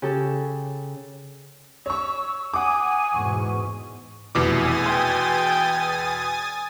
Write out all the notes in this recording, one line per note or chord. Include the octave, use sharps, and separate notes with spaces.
C#3 G4 A4
C#5 C#6 E6
F#5 G#5 D6 D#6
E2 G#2 B2 C#6
F1 E2 B2 E4 G#5 D6 D#6 A6
G5 C6 G#6